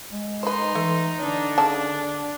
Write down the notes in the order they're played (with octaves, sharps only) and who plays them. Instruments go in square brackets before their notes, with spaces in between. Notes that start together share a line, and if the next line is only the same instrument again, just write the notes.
[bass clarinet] G#3
[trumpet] D#4 [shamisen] B4 C5 [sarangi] C6
[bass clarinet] E3 [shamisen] A3
[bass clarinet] D3 [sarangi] D4
[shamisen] C#3 D5 A5